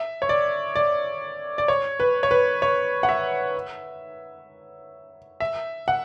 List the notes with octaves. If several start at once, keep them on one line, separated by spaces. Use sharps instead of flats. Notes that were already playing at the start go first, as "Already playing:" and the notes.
Already playing: E5
C#5
D5
D5
D5
C#5
B4
C#5
B4
C#5
F#5
E5
E5
F#5